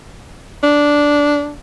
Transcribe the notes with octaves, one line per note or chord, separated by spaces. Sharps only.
D4